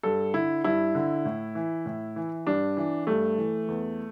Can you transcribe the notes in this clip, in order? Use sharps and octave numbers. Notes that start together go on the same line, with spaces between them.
G2 A4
D3 E4
G2 E4
D3
A2
E3
A2
E3
G2 D4
E3
G2 A3
E3
E2